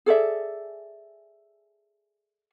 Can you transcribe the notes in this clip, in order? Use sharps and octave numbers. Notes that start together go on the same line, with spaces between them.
G#4 A4 D5 E5